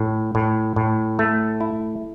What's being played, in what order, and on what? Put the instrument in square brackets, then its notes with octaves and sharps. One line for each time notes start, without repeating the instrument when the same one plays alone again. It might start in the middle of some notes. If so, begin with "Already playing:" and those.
Already playing: [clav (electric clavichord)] A2
A2
A2
A3
E4